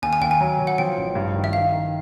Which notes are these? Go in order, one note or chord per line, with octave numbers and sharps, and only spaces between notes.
D#2 G#5
G#5
D#2 G5
G#5
F#3
F#3
F#5
F3 G5
A1
G2
D#3
E5
D#3 F5
D#3